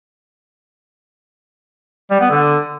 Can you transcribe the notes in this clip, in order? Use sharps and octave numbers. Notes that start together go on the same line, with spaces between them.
G3
B3
D3